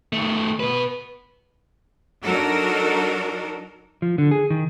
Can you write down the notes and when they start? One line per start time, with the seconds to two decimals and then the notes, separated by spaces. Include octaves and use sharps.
0.13 D#3 A3
0.60 B2 B4
2.24 F#3 D4 D#4 F#4 A4 A#4
4.02 F3
4.18 D3
4.31 G#4
4.50 D#3